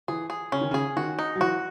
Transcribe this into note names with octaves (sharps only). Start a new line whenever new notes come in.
E3 G#4
G#4
C#3 C#4
D#3
C#3
G#4
D#3 F#4
D#4
F#3
E3 F#4